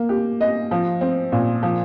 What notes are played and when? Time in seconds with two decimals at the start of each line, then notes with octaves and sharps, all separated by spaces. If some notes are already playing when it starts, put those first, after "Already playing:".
Already playing: A#3
0.09 G4
0.41 D#5
0.71 F3
1.01 C4
1.32 A#2
1.63 F3